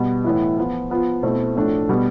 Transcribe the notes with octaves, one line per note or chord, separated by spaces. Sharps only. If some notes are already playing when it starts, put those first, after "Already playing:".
Already playing: B2 G3 B3
A2 E3 B3 E4
F3 B3 F4
F3 B3 F4
B2 A3 C4 E4
A2 F3 A3 D4
B2 G3 B3